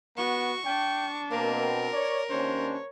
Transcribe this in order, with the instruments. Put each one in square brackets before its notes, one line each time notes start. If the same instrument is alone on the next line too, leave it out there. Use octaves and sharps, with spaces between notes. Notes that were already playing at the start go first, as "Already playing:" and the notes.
[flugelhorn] B3 [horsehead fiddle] F#4 [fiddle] C#6
[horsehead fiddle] D4 [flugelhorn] G5
[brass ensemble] B2 C4 [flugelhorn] A#3 [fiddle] A#4
[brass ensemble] C#5 [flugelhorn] D5
[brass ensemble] D#2 C#4 D4 [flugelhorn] C5 [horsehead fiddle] C#5